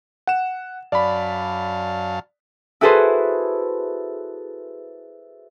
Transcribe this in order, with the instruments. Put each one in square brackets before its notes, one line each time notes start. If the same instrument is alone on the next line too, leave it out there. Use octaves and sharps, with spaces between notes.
[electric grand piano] F#5 E7
[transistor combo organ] F#2 F5 A5 [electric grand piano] D5 B5
[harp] E4 F#4 G#4 A4 B4 C5